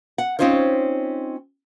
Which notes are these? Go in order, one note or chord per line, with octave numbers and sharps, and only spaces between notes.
F#5
C4 C#4 D#4 F4 C5 C#5